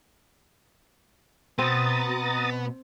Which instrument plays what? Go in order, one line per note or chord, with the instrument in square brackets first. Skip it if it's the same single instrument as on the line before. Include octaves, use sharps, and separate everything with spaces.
[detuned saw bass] B2 [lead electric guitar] B3 [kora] C4 [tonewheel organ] A#5 D#6 A6